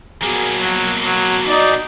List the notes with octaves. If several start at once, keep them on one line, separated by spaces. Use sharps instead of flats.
B2 A#3 F#4 G#4 A#5
F#3
F#3 F#4
D#4 D5